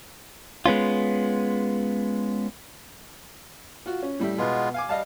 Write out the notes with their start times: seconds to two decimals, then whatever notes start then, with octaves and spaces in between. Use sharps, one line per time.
0.66 G#3 B3 C#4 F4
3.86 F4 F#4
4.02 C#4
4.19 A2 G3 E5
4.38 B2 G#3 B3 F4
4.74 F5 G#5 D6
4.89 G3 D#5 F5 A5